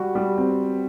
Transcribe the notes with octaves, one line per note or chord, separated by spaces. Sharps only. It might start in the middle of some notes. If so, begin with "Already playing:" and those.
Already playing: G3 F#4
G3
C4